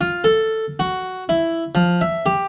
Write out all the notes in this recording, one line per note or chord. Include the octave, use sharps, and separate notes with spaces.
F4
A4
F#4
E4
F3
E5
G4